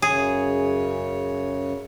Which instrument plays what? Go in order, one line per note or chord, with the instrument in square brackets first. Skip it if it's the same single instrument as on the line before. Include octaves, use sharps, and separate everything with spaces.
[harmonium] F#2 C#3 C#5 [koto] G#4